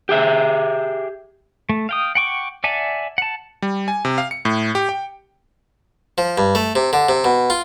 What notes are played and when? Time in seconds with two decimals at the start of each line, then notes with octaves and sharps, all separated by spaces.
0.09 G4 G#4 E5
1.69 A3
1.89 F5 G5 D#6
2.15 F#5 G5 C#6 D6
2.64 D5 E5 F#5 G#5 A5
3.18 F#5 A5
3.62 G3
3.88 G#5
4.05 C3
4.18 F5
4.31 C#7
4.45 A2
4.75 G4
4.89 G5
6.18 F3
6.38 G2
6.55 A3
6.75 C3
6.93 D3
7.09 C3
7.24 B2
7.50 F4